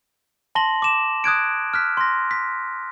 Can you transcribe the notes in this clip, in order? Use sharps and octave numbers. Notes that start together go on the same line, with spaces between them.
A5 C6 A#6 F#7 G7
D6 E7
D#6 F#6 G#6 D7
F6 F#6 B6
C6 A#6
B6